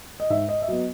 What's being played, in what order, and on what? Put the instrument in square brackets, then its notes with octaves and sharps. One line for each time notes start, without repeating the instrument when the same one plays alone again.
[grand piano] D#5
G#2 E5
D#5
E5
F#3 B3 D#5